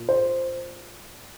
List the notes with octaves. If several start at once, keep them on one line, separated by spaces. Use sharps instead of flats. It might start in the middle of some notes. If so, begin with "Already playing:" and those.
Already playing: A#2
C5